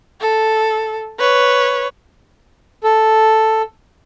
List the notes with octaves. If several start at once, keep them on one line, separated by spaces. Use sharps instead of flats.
A4
B4 C#5
A4